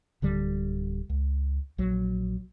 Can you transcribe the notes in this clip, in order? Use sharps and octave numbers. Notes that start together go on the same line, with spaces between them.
D1 D3 G3
C#2
A#1 F#3